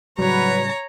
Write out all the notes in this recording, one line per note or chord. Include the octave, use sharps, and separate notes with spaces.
A2 C#3 F#3 G3 B4 C#5 A#5